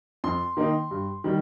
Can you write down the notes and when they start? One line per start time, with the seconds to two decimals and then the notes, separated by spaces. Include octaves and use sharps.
0.24 F2 C6
0.57 D#3 A#3 D#4
0.91 G2
1.24 D#3 G3